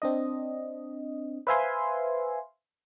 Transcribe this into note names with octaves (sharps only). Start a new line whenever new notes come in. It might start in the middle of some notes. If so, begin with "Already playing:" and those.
C4 D4 D#5
B4 C5 E5 F5 G#5 C6